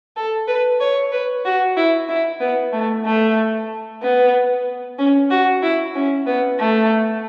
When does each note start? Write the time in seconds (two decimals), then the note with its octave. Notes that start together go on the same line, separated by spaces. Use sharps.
0.16 A4
0.47 B4
0.80 C#5
1.12 B4
1.45 F#4
1.77 E4
2.09 E4
2.40 B3
2.72 A3
3.05 A3
4.02 B3
4.99 C#4
5.30 F#4
5.63 E4
5.95 C#4
6.26 B3
6.59 A3